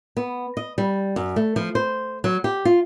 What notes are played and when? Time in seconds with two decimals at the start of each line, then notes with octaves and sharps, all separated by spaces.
0.17 B3
0.57 D#5
0.78 G3
1.16 F#2
1.36 A3
1.56 F3
1.75 C5
2.24 F#3
2.44 G4
2.65 F4